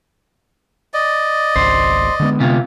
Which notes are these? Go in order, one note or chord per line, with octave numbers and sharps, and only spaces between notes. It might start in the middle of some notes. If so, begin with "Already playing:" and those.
D5 D#5
G#1 C#2 C5
D3 G#3 B3
C3 F4